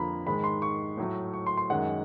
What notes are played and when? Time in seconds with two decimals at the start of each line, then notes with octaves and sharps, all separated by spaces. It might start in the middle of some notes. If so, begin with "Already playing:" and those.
Already playing: F2 D3 F3 A#3 A#5 B5
0.26 G#2 D#3 G#3 B5
0.44 C6
0.62 C#6
0.97 A2 F#3 A3
1.33 C#6
1.47 C6
1.57 C6
1.70 F#2 D#3 G#3 F#5